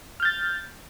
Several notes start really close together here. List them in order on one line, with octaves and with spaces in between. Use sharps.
F6 G6 A6